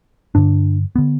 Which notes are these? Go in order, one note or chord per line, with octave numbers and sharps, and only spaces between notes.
G2 D3 D4
D3 B3